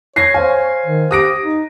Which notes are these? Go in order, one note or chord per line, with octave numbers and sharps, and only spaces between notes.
C#5 G#6 A#6 C7
C5 F5 G#5
D#3
G4 D#6 A#6 D7
D#4